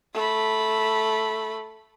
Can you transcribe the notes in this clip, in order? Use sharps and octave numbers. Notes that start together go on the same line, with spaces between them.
A3 B5